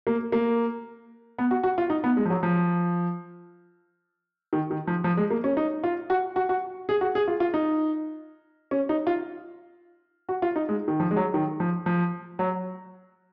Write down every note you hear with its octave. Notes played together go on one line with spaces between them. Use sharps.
A#3
A#3
B3
F#4
F#4
F4
D#4
B3
G#3
F3
F#3
F3
D#3
D#3
F3
F3
G#3
A#3
C#4
D#4
F4
F#4
F#4
F#4
G#4
F#4
G#4
F4
F4
D#4
C#4
D#4
F4
F#4
F4
D#4
G#3
D#3
F3
G#3
F#3
D#3
F3
F3
F#3